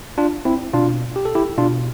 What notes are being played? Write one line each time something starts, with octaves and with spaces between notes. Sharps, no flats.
D4 F4
C4 E4
B2 D4 F4
G4
A4
E4 G4
B2 D4 F4